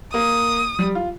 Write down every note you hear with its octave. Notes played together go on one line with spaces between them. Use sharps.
A#3 D#6
G3
F4